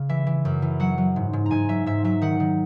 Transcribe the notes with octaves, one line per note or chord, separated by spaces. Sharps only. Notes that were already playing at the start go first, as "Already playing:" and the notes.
Already playing: C#3
E3 E5
E3
F#2
E3
F#3 F#5
F#3
G#2
G#2
A#5
G#2 G#5
F#3 E5
G#2 E5
F#3 E5
D#3 F#5
D#3